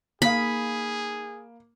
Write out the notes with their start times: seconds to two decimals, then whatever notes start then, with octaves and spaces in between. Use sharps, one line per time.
0.22 A#3 D#4 G#4 F5 B5